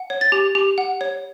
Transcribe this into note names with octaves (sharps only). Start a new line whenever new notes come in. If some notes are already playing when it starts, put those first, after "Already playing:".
Already playing: F#5
C#5
A6
G4
G4
F#5
C#5